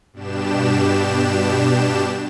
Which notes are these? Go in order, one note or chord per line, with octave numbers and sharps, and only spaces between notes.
G2 B2 D4 G4 E7